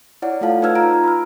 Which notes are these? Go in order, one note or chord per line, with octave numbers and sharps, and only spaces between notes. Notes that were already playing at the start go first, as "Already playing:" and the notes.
E4 C#5 D5 F#5
A3 F4 A4 F5 A5
D#4 B4 A5 E6 F6 G#6
F4 A#5 D7
B5 F6